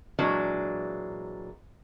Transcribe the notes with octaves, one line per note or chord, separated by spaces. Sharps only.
A#2 E3 F#3 G#3 D4